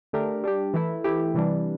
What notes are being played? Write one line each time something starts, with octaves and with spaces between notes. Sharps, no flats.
D3 A3 D4 G4 A#4
G3 D4 G4
E3 A3 E4
E3 A3 E4 G4
C3 E3 G3 D4